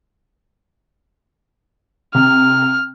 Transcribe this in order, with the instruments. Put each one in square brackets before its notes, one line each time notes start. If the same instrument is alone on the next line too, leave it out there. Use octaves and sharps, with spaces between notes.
[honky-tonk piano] C3 [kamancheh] F6